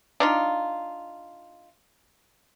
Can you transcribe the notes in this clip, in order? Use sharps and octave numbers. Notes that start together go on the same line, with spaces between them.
D4 D#4 F4